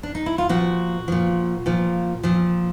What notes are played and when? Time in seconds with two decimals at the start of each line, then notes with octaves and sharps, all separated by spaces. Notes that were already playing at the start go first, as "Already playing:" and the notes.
0.03 D4
0.15 D#4
0.26 E4
0.38 F4
0.49 A#2 F3 F#4
1.08 A#2 F3
1.66 A#2 F3
2.23 A#2 F3